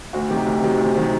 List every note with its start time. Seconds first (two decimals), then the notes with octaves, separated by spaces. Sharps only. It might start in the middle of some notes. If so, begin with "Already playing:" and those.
0.13 D2 F#4
0.30 C3 D#3 F#3 G4
0.46 D2
0.62 C3 D#3 F#3
0.78 D2
0.95 C3 D#3 F#3